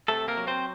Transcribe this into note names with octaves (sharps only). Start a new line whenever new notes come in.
C3 A3 A4
A#3 A#4
F#3
C4 C5